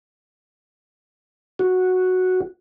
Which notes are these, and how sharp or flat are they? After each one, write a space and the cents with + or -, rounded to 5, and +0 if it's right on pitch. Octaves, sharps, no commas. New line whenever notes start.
F#4 -5